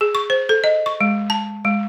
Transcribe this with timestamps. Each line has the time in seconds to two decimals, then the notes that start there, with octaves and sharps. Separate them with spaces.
0.01 G#4
0.15 C#6
0.30 C5
0.49 A4
0.64 D#5
0.86 C#6
1.01 G#3
1.30 A5
1.65 G#3